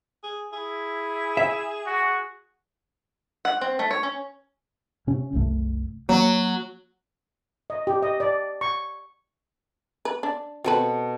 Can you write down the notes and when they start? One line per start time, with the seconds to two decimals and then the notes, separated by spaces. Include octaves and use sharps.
0.24 G#4
0.53 E4 G#4
1.37 E5
1.86 F#4
3.45 F#5
3.61 C4
3.79 A3
3.91 C#5
4.03 C#4
5.07 C3 C#4
5.33 F#1 C2 A3
6.09 F#3 A#3
7.70 D#5
7.87 G4
8.02 D#5
8.20 D5
8.61 C#6
10.05 B4
10.23 D4
10.64 B2 C4 A4 B4